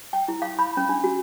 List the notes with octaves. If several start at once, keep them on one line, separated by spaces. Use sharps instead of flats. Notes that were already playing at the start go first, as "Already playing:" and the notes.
G5
E4
F5
B5
C#4
D4
F#4